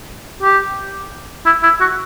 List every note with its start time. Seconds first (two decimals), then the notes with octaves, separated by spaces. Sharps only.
0.43 G4
1.46 E4
1.63 E4
1.81 F#4